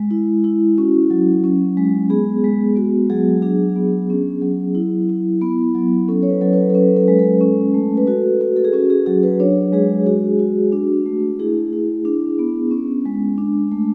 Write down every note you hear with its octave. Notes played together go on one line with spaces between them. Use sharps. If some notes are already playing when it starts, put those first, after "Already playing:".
Already playing: G#3
E4
E4
C#4 F#4
F#3
C#4
G#3
B3 G#4
G#3
B3 F#4
F#3 G#4
D4 G#4
B3
C#4
F#3
E4
E4
B3
F#3
C#4 A4
C#5
B4
F#3
B4
A4
C#4 B4
A4
G#3
A4
C#4
A3
B4
F#4 A4
F#4
A4
G#4
C#4 F#4
G#4
F#3 G#4
B4
D4 C#5
G#3 G#4
F#4 G#4
F#4
D4
A3
E4 G#4
E4
D4
B3
C#4
G#3
D4
A3